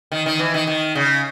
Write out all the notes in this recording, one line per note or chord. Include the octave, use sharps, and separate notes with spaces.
D#3
D#3
E3
D#3
D#3
C#3